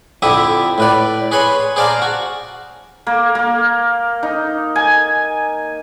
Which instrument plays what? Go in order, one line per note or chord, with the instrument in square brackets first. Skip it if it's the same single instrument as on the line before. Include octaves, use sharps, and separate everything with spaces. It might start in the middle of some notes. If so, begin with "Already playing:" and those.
[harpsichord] F2 D3 E4 G4 E5 D#6
A2 B4 D5
G#4 B4 C#5 B5 C6
G#4 C5 D5 F5 A5 A#5
F#4
[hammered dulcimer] A#3
A#3
D#4
G#5